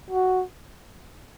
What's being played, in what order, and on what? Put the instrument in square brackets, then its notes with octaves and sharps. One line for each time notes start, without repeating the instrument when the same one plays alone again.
[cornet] F#4